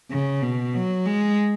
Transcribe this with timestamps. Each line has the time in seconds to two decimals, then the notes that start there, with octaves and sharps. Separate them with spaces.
0.11 C#3
0.42 B2
0.75 F#3
1.06 G#3